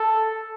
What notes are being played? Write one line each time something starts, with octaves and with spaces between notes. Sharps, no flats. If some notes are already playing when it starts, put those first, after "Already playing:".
Already playing: A4